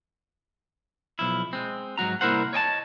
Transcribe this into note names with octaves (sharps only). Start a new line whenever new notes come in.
B1 F3 E4
G#3 C4
G#2 F#3 F#4 A#5
C2 A#3 E4 A#4 C5 F#5
C#5 D#5 G5 A5